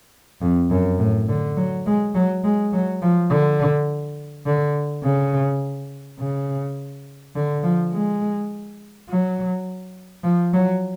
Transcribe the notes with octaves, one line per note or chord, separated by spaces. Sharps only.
F2
F#2
A2
D3
F#3
G#3
F#3
G#3
F#3
F3
D3
D3
C#3
C#3
D3
F3
G#3
F#3
F3
F#3